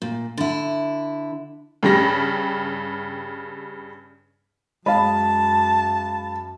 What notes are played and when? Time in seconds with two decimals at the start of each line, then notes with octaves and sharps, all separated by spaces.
0.02 A#2
0.38 D3 E4
1.83 G2 C#3 G3 A#6
4.86 F#2 G#3 D#5 F5 A5 B5